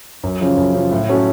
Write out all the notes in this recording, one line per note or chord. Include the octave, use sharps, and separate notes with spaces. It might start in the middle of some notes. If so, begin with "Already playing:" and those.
F#2
C#3 F3
F#2
C#3 F3
A2
F#3 A3 C#4 F#4